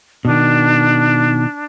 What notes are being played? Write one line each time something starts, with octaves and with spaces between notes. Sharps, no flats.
B2 D#3 D4